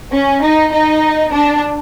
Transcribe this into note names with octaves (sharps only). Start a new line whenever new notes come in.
C#4
D#4
D#4
D4